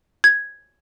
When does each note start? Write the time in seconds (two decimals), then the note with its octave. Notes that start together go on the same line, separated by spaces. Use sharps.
0.24 G#6